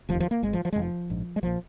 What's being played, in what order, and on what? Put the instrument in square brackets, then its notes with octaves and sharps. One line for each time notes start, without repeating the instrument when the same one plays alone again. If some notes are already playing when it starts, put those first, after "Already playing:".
[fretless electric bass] F1 F3
D#2
F3
A#3
G#1 G#2 G#3
F3
F3
G#3
F1 D#2 F3
A#1 G#2
G#3
A#1 A#2 F3